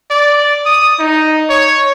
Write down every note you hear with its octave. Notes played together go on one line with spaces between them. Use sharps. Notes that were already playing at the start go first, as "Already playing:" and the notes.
D5
D#6
D#4
C#5